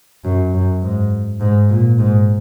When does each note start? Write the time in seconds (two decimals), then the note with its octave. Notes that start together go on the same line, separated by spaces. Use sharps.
0.24 F#2
0.54 F#2
0.83 G#2
1.41 G#2
1.70 A#2
1.99 G#2